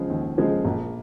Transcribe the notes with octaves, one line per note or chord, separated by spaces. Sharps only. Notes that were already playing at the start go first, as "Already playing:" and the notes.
Already playing: C#3 F3 G#3
D#2
C#3 F3 G#3
A#1